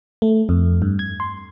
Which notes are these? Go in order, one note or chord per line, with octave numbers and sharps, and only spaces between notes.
A3
F2
G2
G#6
C6